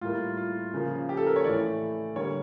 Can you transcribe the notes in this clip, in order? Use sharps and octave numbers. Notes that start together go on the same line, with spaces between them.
A2 G3 A#3 F4
F4
C#3 F3 A#3
G4
A4
A#4
C#5
A2 E3 A3 D5
D3 G3 A#3 C#5